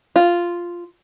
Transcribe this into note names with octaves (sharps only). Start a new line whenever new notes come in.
F4